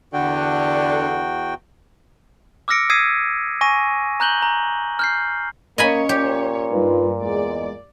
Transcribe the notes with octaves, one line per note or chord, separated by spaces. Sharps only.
E2 D3 F#4 G5
D6 E6 F6 A#6 C#7 D7
D#6 E6 G#6 B6 C7 D#7
G#5 C#6 A#6 D#7
A#5 F#6 G6 F#7 G7
A#5
F6 G6 C7
A#3 C#4 C#5 D#5 G#5 B5
A#2 G4
G2 D#4 F4 B4
E2 G#3 D5